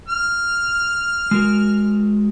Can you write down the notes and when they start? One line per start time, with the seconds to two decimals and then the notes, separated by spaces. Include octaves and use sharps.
0.08 F6
1.31 G#3 F#4 A#4